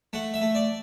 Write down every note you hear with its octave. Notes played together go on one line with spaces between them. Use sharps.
A3 F#5
E5
A3
D5